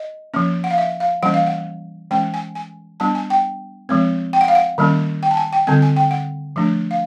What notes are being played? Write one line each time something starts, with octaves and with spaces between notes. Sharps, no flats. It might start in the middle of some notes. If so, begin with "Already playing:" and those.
Already playing: D#5
F3 A#3 C#4
F#5
F5
E5
F5
E3 G3 A#3 C#4 F#5
F5
F#5
E3 G#3 C#4 G5
G#5
G#5
G3 B3 D4 A5
G#5
G5
F3 G#3 C4
G5
F#5
F5
F#5
D#3 G3 A#3 C#4
G5
A5
G#5
G5
D3 G3 C4 G#5
G#5
G5
F#5
F3 A3 D4
F5